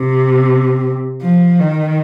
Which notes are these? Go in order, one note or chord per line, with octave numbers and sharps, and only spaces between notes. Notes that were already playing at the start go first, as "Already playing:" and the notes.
Already playing: C3
F3
D#3